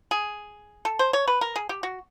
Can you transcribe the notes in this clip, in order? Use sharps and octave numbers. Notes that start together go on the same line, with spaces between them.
G#4
A4
C5
C#5
B4
A#4
G#4
G4
F#4